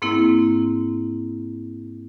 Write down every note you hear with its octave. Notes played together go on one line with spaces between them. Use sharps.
G#2 A#3 C4 E4